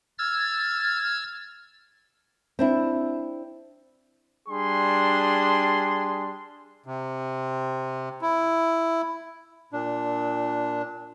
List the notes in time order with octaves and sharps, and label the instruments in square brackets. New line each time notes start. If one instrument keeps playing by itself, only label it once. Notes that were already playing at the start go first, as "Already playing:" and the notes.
[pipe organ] E6 F6 G#6 A6
[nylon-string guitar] C4 D4 E4
[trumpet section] G3 D4 G#4 C6
[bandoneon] C3
E4
A#2 D4